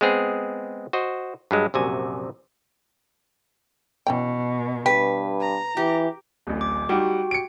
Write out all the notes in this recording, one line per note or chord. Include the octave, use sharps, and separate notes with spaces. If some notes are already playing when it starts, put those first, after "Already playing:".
G#3 B3 C4 G#4
F#4 C5 D#5
G2 F#3 G#3
A#1 F#2 C3 F#4 G#5
B2 E3 C#4 G5
G2 B4 G5
A#5
E3 G4
D1 A1
D6
G3 D#4 F#4 G4 F#5 G5
C#7 D7